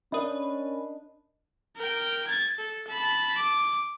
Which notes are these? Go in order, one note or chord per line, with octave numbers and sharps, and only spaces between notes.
C#4 D4 A#4 D#5 B5
A#4 G5
G#6 A6
A4
A5 B5
D6